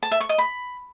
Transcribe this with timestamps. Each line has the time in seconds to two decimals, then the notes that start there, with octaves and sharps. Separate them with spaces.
0.03 A5
0.11 E5
0.20 C#6
0.29 D#5
0.38 B5